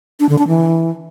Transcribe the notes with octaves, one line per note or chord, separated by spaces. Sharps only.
D4
D3
D4
E3